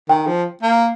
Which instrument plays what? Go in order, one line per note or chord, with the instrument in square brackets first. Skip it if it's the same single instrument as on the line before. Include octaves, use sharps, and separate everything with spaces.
[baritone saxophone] D#3 [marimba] G5
[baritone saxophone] F3
A#3